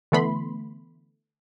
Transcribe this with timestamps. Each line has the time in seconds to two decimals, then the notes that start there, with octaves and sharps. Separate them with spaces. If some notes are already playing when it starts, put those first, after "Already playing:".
0.12 D3 E3 A3 B3 B5 C6